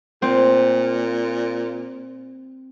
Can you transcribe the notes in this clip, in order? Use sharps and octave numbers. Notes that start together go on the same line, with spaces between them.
A#2 C4